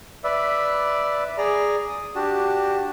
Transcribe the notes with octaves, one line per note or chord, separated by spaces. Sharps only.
B4 D5 E5
G#4 D5 A#5
D#6
D4 F#4 G4 A5